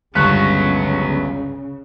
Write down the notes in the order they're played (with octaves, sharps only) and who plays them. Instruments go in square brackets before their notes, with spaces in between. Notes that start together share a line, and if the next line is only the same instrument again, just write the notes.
[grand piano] G1 C#2 G2 [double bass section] C#3 [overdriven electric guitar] F#3 B3 [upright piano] C#6 F#6